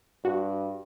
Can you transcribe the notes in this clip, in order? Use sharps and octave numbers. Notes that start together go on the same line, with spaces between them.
G2 F#4